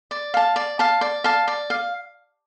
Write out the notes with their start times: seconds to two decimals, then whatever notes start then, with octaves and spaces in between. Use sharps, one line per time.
0.11 D5
0.34 F5 A5
0.56 D5
0.79 F5 A5
1.01 D5
1.24 F5 A5
1.48 D5
1.70 F5